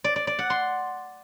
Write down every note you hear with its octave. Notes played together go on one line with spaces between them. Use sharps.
D5
D5
D5
F#5
C6